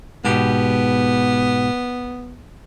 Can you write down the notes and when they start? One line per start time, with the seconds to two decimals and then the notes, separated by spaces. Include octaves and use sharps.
0.25 G#2 B2 B3 G4